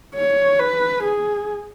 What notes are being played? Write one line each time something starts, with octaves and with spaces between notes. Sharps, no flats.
C#5
B4
G#4